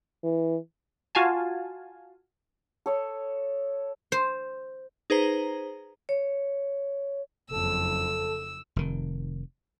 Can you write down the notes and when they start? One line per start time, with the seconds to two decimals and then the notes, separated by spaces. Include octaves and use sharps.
0.24 E3
1.15 F4 F#4 F5 G#5 A5
2.86 A4 C#5 D#6
4.12 C5
5.10 D#4 G#4 B4 C5 A#5
6.09 C#5
7.51 F#1 F2 A4 E6
8.76 F1 D#3